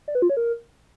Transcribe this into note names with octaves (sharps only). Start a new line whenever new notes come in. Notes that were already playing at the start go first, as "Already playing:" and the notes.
D5
B4
F4
C#5
A#4